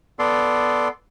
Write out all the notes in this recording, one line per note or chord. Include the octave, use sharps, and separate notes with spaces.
B3 A4 D5 C6